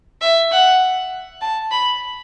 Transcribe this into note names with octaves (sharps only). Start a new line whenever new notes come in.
E5
F#5
A5
B5